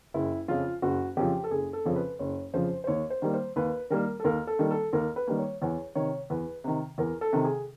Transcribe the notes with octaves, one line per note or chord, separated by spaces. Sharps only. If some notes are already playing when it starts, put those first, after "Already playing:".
F#1 E4
F2 C#3 F3 F4
F#1 F#4
F2 C#3 F3 G4
A4
F#1 G#4
A4
F2 C#3 F3
B4
F#1 C#5
F2 C#3 F3 C5
C5
D#2 C#5
C5
D#3 G3 A#3
C5
D#2 B4
D#3 G3 A#3 A#4
A4
D#2 A#4
A4
D#3 G3 A#3
A4
D#2 A#4
B4
D#3 G3 A#3
C#5
E2 C#5
C3 D#3 C#5
E2 B4
C3 D#3
E2 A#4
A4
C3 D#3
G#4